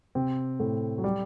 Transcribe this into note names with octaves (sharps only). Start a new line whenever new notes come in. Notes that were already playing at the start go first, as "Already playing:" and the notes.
C3 C4
A2 A3
F#3
G3